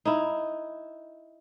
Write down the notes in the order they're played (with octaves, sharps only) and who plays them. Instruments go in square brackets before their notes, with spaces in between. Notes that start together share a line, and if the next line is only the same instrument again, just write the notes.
[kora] D#4 E4